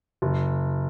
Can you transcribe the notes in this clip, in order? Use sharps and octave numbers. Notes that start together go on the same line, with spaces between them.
F#1